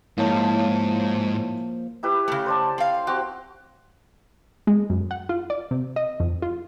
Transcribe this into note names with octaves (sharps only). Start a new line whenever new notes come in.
G#2 F3 A#3 E4 C#5 A5
E4 G4 B4
C#3 A3
C5 D5 A5
C4 F5
C4 F#4 G4 F#5
G#3
F#2
F#5
F4
D5
C3
D#5
F2
F4